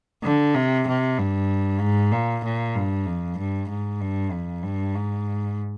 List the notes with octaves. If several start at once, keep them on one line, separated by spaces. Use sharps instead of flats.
D3
C3
C3
G2
G#2
A#2
A#2
G2
F2
G2
G#2
G2
F2
G2
G#2